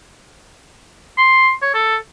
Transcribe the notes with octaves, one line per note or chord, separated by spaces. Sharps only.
C6
C#5
A4